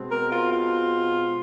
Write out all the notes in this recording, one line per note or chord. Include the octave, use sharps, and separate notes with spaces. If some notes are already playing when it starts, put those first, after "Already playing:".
Already playing: B2 G#3 C4
A#4
F4
F4